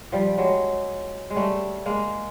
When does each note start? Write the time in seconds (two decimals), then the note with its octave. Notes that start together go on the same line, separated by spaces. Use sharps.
0.12 F3 G3
0.38 F#3 G#3
1.30 G#3
1.36 G3 A3
1.86 G#3 A#3